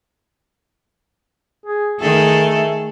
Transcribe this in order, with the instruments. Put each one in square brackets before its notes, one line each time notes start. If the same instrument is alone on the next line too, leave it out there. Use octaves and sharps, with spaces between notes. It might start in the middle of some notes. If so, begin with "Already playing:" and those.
[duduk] G#4
[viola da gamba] D#3 G#4 A4 [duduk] A3